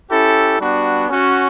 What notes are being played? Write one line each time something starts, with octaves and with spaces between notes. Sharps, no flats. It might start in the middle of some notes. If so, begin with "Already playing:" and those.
C#4 E4 G4 A4
G3 B3 D4 F#4
C#4 F#4